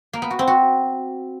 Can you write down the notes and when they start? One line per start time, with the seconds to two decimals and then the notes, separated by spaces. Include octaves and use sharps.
0.13 A#3
0.22 B3
0.30 F#4
0.39 C4
0.47 F#4